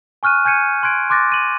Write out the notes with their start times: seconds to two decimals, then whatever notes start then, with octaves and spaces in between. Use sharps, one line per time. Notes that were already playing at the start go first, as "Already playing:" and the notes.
0.23 G#5 C#6 F6 F#6 D#7
0.45 G#5 G6 G#6 C#7 D#7
0.83 C6 F#6 G#6 D7
1.10 C6 D6 F#6 A6 A#6
1.30 F6 D#7 F#7